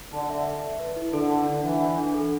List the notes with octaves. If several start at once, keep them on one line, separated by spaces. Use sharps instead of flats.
D3 A5
E5
E5
E5
B4
E4
D3 A4
F#5
D4
E3 F#5
F#5
D4
A4